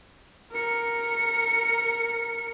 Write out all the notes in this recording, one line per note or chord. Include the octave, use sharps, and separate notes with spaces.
A#4 C#7